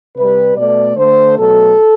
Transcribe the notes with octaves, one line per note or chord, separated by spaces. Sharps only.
C3 G3 B4
B2 A3 D5
D3 A3 C5
B2 F#3 A3 A4